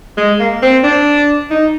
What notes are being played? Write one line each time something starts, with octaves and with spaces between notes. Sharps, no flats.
G#3
A#3
C4
D4
D#4